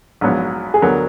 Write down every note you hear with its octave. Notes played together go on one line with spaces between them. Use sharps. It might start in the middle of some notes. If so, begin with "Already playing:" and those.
A#1 G#2 F#3 B3
G#4
D2 D3 F#3 B3 A#4